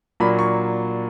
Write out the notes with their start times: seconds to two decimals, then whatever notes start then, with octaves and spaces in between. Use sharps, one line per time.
0.20 A#2 F#3 A#3 D4 B5
0.39 C#6